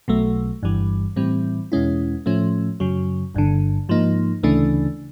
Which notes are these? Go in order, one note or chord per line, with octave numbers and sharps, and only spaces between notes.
B1 B2 F#3 A3
G1 G2 E3 G3
A2 E3 G3 C4
E2 B2 G#3 C#4 E4
A2 F3 A3 C#4
F#2 C#3 F#3
G1 G2 D3
G#2 F3 A#3 D#4
D2 C#3 E3 A3 D4